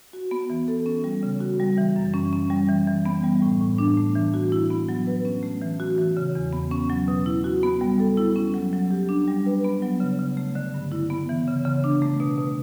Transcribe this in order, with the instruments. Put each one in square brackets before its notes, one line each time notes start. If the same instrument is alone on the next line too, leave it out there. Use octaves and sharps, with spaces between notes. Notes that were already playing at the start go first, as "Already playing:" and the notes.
[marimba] F#4
B3
E3
A4
C#4
G3
C#3
F#4
G3
E3
F#2
C#4
C#4
G3
E3
E3
B3
G3
A2
A2
D4
A3
E3
F#4
E4
B3
F#3
B4
C#4
A3
E3
F#4
E3
C#3
E2
B3
C#4
F#3
B2
E4
F#4
B3
G3
A4
E4
C#4
F#3
F#3
G4
D4
G3
B4
B3
F#3
C#3
C#3
A3
D3
G2
E4
B3
E3
C#3
C#3
D4
A3
B2
B2